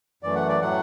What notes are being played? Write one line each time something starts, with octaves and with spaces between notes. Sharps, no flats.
F#2 E3 A3 D5
F#5
D5
A2 F#3 A3 F#5